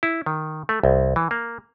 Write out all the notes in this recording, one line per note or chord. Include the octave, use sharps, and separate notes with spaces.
E4
D#3
A3
C2
E3
A#3